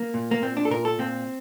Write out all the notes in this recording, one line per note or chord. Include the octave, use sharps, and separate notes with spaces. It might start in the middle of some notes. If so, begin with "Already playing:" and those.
Already playing: A#3
A#2
A#3
A#2 C4
D4
A4
A#2 A#4
A4
A#2 C4